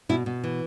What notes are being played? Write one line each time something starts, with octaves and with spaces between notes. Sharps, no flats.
B2 E4
B2
E3